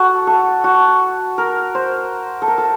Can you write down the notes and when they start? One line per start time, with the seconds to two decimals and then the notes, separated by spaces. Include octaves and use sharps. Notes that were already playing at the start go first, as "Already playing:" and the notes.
Already playing: F#4 A4
0.27 A4
0.64 F#4
1.38 A#4
1.75 C5
2.42 A4
2.48 A#4
2.58 A4